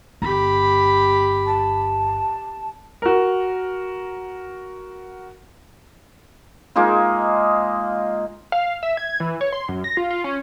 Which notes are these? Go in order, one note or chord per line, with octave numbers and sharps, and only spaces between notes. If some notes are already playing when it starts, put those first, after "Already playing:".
G1 G4 B5
A5
F#4 A#4
G#3 A#3 D#4 F4
F5
E5
G#6
E3
C#5
C6
F#2
A#6
F4
F4
C#4